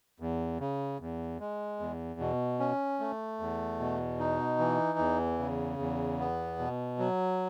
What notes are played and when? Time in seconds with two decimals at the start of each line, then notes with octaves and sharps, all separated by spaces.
0.20 E2
0.60 C#3
1.00 E2
1.40 G#3
1.80 E2
2.20 B2
2.59 C#4
3.00 A3
3.40 E2
3.80 B2
4.19 D#4
4.59 E3
4.98 E2
5.39 C#3
5.78 E2
6.19 B3
6.59 B2
6.99 F#3